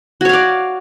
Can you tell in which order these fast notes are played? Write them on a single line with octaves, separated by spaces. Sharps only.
F#4 C#5 F5 D5